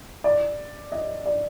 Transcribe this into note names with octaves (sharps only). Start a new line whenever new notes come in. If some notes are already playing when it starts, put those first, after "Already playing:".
D5
D#5
D5